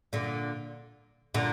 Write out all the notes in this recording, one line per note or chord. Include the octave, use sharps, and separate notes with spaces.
A#2 D3
A#2 D3